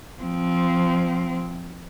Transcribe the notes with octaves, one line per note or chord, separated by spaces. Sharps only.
F3 C4